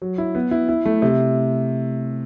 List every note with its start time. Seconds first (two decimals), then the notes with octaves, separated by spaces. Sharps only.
0.02 F#3
0.18 E4
0.35 B3
0.51 E4
0.69 E4
0.86 A3
1.02 C3